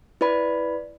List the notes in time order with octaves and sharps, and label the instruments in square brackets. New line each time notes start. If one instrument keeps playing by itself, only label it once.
[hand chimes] E4 B4 D5 B5